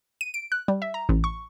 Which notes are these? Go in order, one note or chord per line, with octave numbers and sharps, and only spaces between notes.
D#7
D7
F#6
G3
E5
A#5
A1
C#6